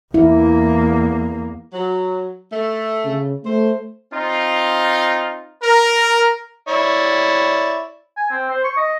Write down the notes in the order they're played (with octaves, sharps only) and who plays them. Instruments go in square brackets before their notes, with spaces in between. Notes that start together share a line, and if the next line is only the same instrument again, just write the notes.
[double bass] E2 A#3 [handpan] E4
[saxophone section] F#3
A3
[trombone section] C#3
[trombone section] A3 [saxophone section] C5
[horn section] C4 D#4 F4
A#4
[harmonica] E4 C#5 D5
[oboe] G#5
C4
C5
C#6
D#5